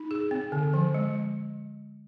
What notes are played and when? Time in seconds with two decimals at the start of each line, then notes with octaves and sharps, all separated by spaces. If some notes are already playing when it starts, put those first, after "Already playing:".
Already playing: D#4
0.11 G#4
0.31 C4
0.52 D3
0.74 F3
0.94 G#3